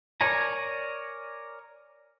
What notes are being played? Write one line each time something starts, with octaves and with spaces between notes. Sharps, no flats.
A#4 C#5 D5 G#5 A#5